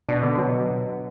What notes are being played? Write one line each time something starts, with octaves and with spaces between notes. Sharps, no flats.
B2 D4
D3 B3
B2 F#3